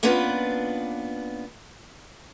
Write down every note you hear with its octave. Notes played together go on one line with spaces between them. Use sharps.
A#3 B3 C#4 D4 F4 B4